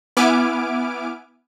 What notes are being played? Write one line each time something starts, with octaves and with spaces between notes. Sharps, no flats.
B3 E4 G#5 D6 F6 D7